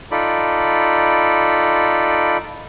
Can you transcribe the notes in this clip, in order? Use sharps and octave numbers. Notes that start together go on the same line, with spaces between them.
D#4 F4 A4 D5 B5